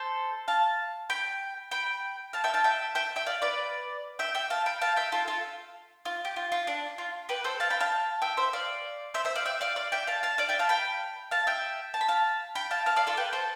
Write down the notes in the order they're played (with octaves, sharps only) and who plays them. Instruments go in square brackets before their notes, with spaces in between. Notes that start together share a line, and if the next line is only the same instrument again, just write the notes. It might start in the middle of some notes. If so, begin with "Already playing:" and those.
Already playing: [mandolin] A4 C5
F5 A5
G5 B5
G5 B5
F5 A5
E5 G5
F5 A5
E5 G5
E5 G5
E5 G5
D5 F5
B4 D5
E5 G5
E5 G5
F5 A5
G5 B5
F5 A5
E5 G5
F4 A4
F4 A4
F4
G4
F4
F4
D4
F4
G4 B4
A4 C5
F5 A5
G5 B5
F5 A5
E5 G5
C5 E5
D5 F5
C5 E5
C5 E5
D5 F5
E5 G5
D5 F5
D5 F5
E5 G5
F5 A5
F5 A5
D5 F5
E5 G5
F5 A5
G5 B5
F5 A5
E5 G5
A5
B5
F5 A5
G5 B5
F5 A5
F5 A5
D5 F5
F4 A4
G4 B4
A4 C5